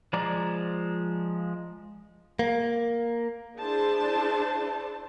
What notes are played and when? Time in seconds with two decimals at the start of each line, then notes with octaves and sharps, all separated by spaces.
0.13 F3 G#3 D5 A#5 D6
2.39 A#3
3.56 D4 E4 G#4 C5 A5